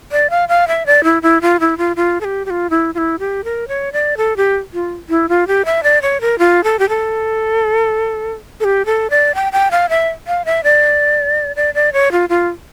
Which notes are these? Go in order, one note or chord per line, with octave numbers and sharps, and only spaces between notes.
D5
F5
F5
E5
D5
E4
E4
F4
E4
F4
F4
A4
G4
G4
F4
E4
F4
E4
G4
A#4
C#5
D5
A4
G4
F4
E4
F4
G4
E5
D5
C#5
A#4
F4
A4
G4
A4
A4
G4
A4
D5
G5
G5
F5
E5
F5
E5
D5
D5
D5
C#5
F4
F4